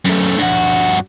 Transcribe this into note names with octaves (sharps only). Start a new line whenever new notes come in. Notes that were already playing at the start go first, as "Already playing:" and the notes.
F#2 A3
G2 F#4